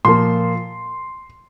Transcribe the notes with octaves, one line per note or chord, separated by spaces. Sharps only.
A#2 F3 A#3 C6